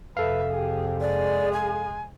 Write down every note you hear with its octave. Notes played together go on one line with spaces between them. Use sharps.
F2 C3 A4 B4 E5 F5
G4 G#4
G#3 G#4 D5
G#5